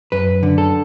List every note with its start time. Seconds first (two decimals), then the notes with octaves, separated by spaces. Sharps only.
0.12 F#2 B4
0.43 D3
0.58 A4